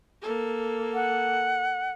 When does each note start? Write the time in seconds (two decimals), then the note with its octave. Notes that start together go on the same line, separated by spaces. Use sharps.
0.22 A#3 A4
0.94 F#5